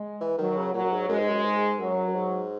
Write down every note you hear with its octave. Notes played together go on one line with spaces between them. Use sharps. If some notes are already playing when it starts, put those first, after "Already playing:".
Already playing: G#3
E3
D#3 F#3
C#3
A#2 F#3
F#2
G#2
F#2 G#3
G#2
F#2
G#2
F#2 F#3
F#2
G#2